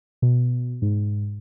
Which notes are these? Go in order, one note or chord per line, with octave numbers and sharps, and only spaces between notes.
B2
G#2